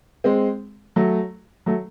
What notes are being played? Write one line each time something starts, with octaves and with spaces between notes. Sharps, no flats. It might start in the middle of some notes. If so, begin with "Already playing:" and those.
G#3 C4
F#3 A3
F#3 A3